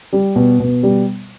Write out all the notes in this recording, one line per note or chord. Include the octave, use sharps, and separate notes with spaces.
G3
B2
B2
G3